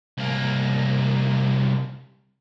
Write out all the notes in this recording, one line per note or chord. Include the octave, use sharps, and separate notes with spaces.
C2 A#3